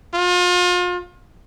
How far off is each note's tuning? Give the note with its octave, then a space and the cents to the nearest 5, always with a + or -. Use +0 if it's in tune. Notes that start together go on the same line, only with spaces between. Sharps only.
F4 +35